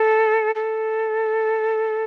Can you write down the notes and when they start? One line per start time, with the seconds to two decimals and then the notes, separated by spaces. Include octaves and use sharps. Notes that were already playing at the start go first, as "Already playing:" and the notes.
Already playing: A4
0.55 A4